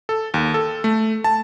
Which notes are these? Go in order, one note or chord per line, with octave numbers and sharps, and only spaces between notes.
A4
D#2
A4
A3
A5